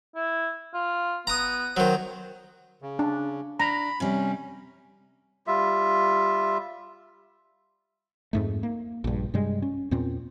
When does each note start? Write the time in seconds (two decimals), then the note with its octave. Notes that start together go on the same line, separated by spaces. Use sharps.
0.15 E4
0.74 F4
1.27 B3 A#5 D#6
1.77 D#3 F#3 C5
2.82 C#3
2.99 D4
3.60 D4 A#5 B5
4.00 C3 G3 C#4
5.47 G3 F4 E5
8.33 F2 G#2 A3
8.63 A#3
9.04 A#1 G2
9.34 G2 C3 G3 G#3
9.62 C#4
9.91 E2 A#2 C4 C#4